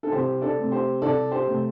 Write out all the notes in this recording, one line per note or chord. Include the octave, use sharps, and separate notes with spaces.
A4
C2 G4 C5
A4 D5
C3 A3 C4
G4 C5
C2 A4 D5
G4 C5
C3 A3 C4